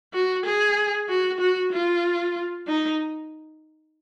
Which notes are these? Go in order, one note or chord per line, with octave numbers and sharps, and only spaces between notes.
F#4
G#4
F#4
F#4
F4
D#4